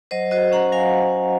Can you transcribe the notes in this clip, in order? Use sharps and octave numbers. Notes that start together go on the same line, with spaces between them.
F#3 C5 D#5
F#4 C5 D#5
C#4 F#5 A#5
F#3 F5 G#5